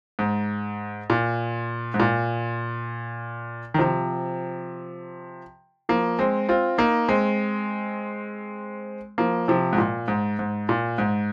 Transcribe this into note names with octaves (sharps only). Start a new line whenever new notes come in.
G#2
A#2
G#2
A#2
D#3
C3 F3
F3 A#3
G#3 C4
C4 F4
A#3 D#4
G#3 C4
F3 A#3
C3 F3
G#2
A#2
G#2
G#2
A#2
G#2